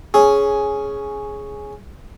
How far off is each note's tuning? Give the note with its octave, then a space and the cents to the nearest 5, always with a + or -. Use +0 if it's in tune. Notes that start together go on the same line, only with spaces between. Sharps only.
C#4 +0 G#4 +5